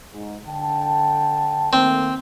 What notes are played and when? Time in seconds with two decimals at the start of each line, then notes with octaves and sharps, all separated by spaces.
0.13 G#2
0.47 D3 G5 A5
1.73 D#3 A3 A#3 C4